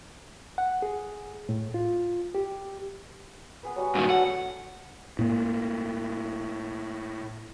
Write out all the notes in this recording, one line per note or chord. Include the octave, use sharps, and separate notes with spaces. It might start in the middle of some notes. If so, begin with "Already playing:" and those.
F#5
G#4
A2
F4
G4
B3 G#4 B4
F#3 G3 F#4
G2 A#2 D#3
A4 F#5
A2 A#3